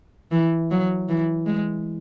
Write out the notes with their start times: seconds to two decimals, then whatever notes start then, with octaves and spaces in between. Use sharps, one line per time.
0.32 E3
0.71 F#3
1.09 E3
1.46 G#3